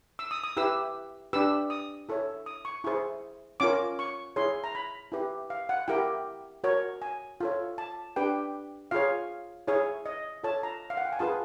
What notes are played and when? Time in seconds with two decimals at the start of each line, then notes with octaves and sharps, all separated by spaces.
0.19 E6
0.31 D#6
0.44 D#6
0.57 E4 G4 B4 E6
1.33 D4 G4 B4 E6
1.70 D#6
2.09 E4 A4 C#5
2.46 D#6
2.65 C#6
2.84 E4 G#4 C5 C#6
3.60 C#4 F4 A#4 D6
3.99 C#6
4.36 E4 G#4 C#5 C6
4.64 A#5
4.75 B5
5.12 E4 G4 B4
5.50 F5
5.69 F#5
5.88 E4 G4 A#4 G5
6.64 F#4 A#4 C#5
7.02 G#5
7.40 F4 A4 C#5
7.78 A5
8.16 D4 G4 B4 G5
8.91 F4 G#4 C#5 F5
9.68 E4 G#4 C#5
10.06 D#5
10.43 F4 A4 C#5 A5
10.63 A#5
10.90 F5
10.97 F#5
11.05 G5
11.13 G#5
11.19 F4 G#4 B4 A5